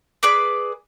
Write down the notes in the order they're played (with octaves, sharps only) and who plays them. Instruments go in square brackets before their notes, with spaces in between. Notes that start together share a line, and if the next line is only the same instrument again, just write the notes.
[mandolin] G#4 B4 D5 D6